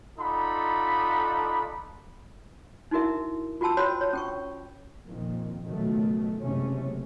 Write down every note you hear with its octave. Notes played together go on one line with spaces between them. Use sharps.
D#4 F4 A4 D5 F#5 B5
D#4 E4 F#4 A#4 E5
F4 F#4 G5 A5 E6
F#4 C5 C#5 G5 B5
C#5
C#4 G5 C#6
F2 A#2 D#3
C#2 B2 D#3 F#3 A3
F#1 C3 G#3 A3 C#4